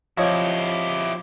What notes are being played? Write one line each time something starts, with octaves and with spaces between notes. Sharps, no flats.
F3 E4 G4 C#5 D#5